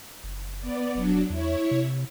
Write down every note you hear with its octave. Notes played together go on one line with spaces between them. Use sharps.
F#1
B3 D5
E1 F#3 D4
E2 E4 C#5
C3